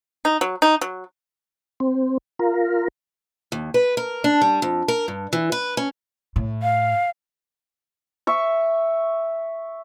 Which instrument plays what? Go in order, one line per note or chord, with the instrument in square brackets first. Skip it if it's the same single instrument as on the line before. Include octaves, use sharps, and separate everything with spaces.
[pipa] D#4
F#3
D#4
F#3
[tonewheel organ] C4
F4 A#4
[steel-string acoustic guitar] D#2
B4
A#4
D4
G3
F2
A#4
G2
E3
B4
C#4
[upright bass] A2
[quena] F5
[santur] E5 C#6